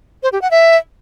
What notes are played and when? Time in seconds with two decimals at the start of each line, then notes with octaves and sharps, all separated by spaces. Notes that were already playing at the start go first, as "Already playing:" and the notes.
0.23 C5
0.32 G4
0.42 F#5
0.51 E5